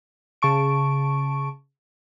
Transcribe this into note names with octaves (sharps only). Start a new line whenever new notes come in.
C#3 A5 C#6 D7